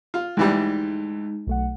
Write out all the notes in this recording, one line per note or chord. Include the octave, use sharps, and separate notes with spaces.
F4
D2 E3 G3 G#3 D#4
B1 A3 F#5